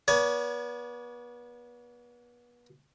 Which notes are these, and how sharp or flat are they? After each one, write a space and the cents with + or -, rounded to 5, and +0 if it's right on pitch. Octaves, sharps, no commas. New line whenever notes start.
B3 -35 D5 -45 G#5 +25